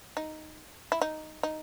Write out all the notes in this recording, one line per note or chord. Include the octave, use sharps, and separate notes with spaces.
D#4
E4
D#4
D#4